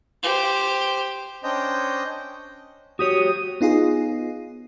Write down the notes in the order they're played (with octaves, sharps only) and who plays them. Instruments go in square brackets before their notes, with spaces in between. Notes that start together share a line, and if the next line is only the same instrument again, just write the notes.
[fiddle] G4 C5
[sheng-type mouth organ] C#4 D4 C5 D#5 G5 G6
[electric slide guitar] F#4 G4 C#5 [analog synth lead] D#6
[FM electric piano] B3 D#4 F4 G#4